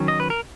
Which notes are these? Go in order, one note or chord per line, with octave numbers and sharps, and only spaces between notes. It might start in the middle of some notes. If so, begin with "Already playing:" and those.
Already playing: D#3 F#3 C#4
D#5
B4
A#4